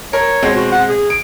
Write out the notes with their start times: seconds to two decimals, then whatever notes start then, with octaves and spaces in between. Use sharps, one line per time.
0.13 A#4 C#5
0.42 B2 G#3 C4
0.55 F#4
0.72 F#5
0.89 G#4
1.10 D7